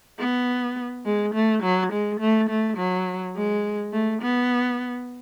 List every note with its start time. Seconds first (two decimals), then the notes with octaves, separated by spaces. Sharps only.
0.19 B3
1.05 G#3
1.34 A3
1.63 F#3
1.92 G#3
2.20 A3
2.50 A3
2.77 F#3
3.36 G#3
3.93 A3
4.22 B3